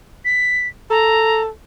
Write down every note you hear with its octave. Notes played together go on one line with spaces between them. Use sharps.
B6
A4 A#5